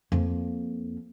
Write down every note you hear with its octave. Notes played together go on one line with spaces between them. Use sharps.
F2 A#3